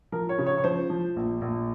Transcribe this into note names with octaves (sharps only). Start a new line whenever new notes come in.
F3 A#4
C#5
C#3
C#5
C#5
F3 C5
F3
A#1
A#1